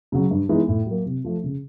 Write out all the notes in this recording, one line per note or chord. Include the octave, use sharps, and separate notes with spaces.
C#3 F#3
G2
E3 G#3 B3 D#4
A2
F#3 A#3
C3
F3 A3
C#3